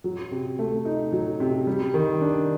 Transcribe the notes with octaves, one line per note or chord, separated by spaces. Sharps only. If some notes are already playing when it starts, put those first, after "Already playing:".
F#3
C3
A3
D#4
F#3
C3
G3
D#3
D4